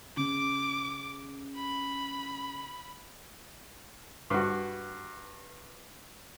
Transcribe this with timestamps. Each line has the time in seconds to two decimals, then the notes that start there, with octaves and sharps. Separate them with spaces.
0.17 C#3 D6
1.56 B5
4.30 G2 F#4